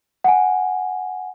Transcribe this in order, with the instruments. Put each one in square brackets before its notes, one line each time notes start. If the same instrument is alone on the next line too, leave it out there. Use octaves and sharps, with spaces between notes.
[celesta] F#5 G#5